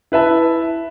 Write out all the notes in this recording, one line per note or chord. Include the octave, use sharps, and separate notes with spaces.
E4 B4 E5 A5